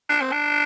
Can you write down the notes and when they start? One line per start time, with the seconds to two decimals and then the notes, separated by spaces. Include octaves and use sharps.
0.09 D4
0.21 C4
0.32 D4